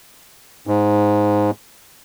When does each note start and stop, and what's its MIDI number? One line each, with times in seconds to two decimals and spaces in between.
0.67 1.51 44